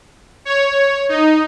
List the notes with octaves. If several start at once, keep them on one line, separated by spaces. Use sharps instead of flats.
C#5
D#4